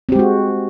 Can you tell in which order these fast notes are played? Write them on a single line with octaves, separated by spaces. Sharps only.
C4 G4 G#3 F#4